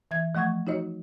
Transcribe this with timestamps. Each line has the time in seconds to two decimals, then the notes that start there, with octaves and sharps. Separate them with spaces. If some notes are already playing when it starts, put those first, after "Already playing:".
0.11 E3 E5 G#6
0.35 F3 A3 F#5 C#6 G#6
0.67 D#4 F#4 C#5 D#5